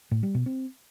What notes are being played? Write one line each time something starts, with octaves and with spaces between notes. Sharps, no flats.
A2
G3
B2
C4